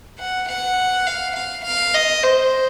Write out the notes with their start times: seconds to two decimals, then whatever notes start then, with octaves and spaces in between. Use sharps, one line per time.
0.19 F#5
0.48 F#5
1.07 F5
1.36 F5
1.65 F5
1.94 D#5
2.23 C5